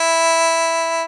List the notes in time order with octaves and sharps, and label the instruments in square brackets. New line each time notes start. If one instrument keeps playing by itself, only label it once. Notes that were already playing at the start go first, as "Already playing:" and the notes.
Already playing: [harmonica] E4